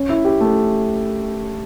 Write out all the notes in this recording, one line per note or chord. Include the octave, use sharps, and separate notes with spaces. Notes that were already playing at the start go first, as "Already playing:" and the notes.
Already playing: C#4
E4
G4
A3